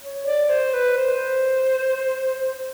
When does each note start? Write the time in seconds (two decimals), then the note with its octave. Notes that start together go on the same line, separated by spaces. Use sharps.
0.02 C#5
0.26 D5
0.49 C5
0.73 B4
0.97 C5